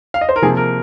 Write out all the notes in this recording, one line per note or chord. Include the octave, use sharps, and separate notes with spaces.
F5
D#5
C5
A#4
C3 F3 A#3 G#4
A#4